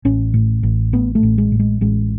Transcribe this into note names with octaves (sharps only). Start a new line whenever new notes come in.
A1 C#4
A2
A1
A2 B3
A3
A1
G#3
A2
G#3
A1 G#3